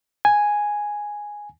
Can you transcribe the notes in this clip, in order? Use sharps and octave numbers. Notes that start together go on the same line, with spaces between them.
G#5